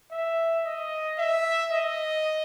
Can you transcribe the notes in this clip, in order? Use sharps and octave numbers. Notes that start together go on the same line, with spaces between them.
E5
D#5
E5
D#5